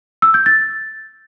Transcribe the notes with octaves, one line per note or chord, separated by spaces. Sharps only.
E6
G6
A6